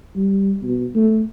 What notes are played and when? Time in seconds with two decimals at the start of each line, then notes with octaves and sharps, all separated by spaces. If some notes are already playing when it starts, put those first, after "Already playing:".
0.16 G3
0.63 B2
0.95 A3